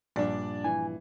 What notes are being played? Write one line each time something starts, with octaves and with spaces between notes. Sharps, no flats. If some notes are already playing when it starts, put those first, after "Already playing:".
A#1 G2 D4 D5
E3 G#5